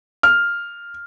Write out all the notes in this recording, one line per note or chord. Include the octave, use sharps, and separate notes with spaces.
F6